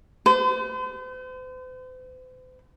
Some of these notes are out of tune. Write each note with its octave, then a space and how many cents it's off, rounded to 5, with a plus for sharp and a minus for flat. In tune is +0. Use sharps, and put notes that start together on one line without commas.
C5 -45